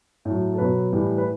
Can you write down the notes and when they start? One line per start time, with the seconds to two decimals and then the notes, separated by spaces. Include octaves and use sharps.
0.25 A2 F#3
0.54 A4
0.58 B2 F#3 B4
0.92 A2 E3 G3
1.18 B4